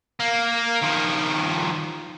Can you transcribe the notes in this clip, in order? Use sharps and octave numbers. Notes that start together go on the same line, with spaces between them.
A#3
D#3 F3